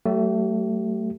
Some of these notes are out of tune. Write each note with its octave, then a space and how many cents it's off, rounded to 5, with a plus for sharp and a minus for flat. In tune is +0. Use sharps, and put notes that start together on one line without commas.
F#3 +45 A3 +15 G4 -35